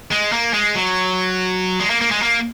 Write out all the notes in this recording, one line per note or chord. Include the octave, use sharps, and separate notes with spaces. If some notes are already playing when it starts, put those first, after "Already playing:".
G#3
A#3
G#3
F#3
G#3
A#3
A#3
G#3
A#3